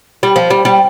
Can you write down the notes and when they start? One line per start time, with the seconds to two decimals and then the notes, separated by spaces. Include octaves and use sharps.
0.23 G3
0.36 F3
0.50 G3
0.65 G3